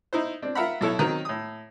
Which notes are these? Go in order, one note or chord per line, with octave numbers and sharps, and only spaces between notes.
D#4 E4 C5
C4 D4
F4 A#4 E5 F#5 B5
B1 E4 A4 C#5
D#3 F#3 C4
A2 D#6